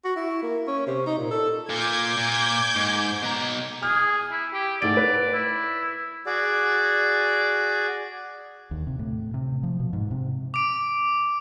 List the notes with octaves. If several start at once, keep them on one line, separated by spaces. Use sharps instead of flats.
F#4
E4
A#3
C#4
C3
D#4
A#2
A4
A#2 D6 G6 G#6
A#2
G#2
B2 A#5
G#4 F6
E4
G4
G#2 A3 D5 D7
B4
E4
F#4 G#4 D5
D#2
C3
A2
C3
F3
B2
G#2
C3
D6 D7